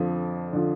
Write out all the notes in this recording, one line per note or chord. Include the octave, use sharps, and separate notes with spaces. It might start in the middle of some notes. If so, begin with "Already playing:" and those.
Already playing: F2 D3 F3
D3 F3